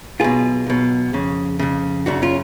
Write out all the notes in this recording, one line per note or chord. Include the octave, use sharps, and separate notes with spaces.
B1 B2 F4 G#4
B1 B2
F2 C#3
F2 C#3
F#2 C#3 D4 F#4
C#4 F4